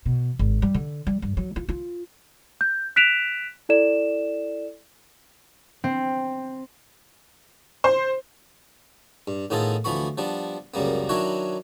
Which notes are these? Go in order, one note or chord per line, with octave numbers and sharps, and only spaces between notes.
B2
G#1
G3
D3
G3
G2
F#3
F4
F4
G6
F#6 B6 D7 E7 F7
E4 A4 D5 E7
C4
C5
G2
A2 D#3 B3 F4 G#4 A4
D2 E3 F3 B3 B5 C#6
F3 G3 B3 D4
C#2 F#2 G3 A#3 B3
D#3 F#3 D4 E4 B4 C#5